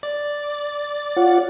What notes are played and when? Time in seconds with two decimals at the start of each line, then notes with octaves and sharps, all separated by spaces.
0.03 D5
1.16 F4 C#5 F#5